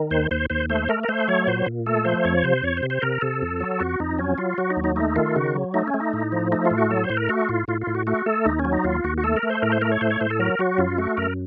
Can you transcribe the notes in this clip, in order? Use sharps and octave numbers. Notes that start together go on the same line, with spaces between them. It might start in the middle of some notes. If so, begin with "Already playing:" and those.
Already playing: D#3
D#2 C5
D#2 C5
D#2 C5
A3 C5
A3 A#4
A#4
A3 C5
F#3 C#5
A#2 C5
A#2
A3 A4
F3 C5
F2 C#5
C3 C5
F2 C#5
C5
C3
C5
C3 A#4
C3 A4
F2
F#3
F2 F#4
F2 D#4
F#3 C#4
F#3 F4
F#3 F#4
D#4
D#2
D#4
A3 D#4
D#3 F4
C#3 F#4
F#3
A3 D#4
C#4
A3
D#4
A2
F3
A3 D#4
F4
A2
F#4
F#3 A4
C5
A2
A#4
A3 F#4
A2 F4
A2 F4
F4
A2
F#4
A3 F#4
A3 A4
D#2 D#4
C#4
F#3
D#4
D#2 F4
D#2 F#4
F#4
A3 A4
A#4
A3
C5
A2 A#4
C5
A3 A#4
C#5
A2 C5
C#5
A2 C5
A4
F#3 A#4
F#3 F#4
F#2 F4
A3 F#4
F#2 A#4